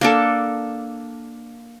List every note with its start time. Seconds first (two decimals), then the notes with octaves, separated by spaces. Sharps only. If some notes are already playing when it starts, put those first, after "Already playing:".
0.01 A#3 D4 A4